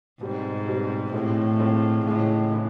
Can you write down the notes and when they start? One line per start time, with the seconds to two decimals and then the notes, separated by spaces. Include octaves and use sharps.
0.21 G#2 B2 G3 C4
0.67 B2 G3 C4
1.13 A2 E3 G#3 C4 F4
1.59 E3 G#3 C4 F4
2.06 A2 C#3 E3 G#3
2.52 E3 G#3